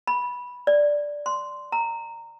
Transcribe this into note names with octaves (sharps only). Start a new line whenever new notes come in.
B5
D5
C6
A#5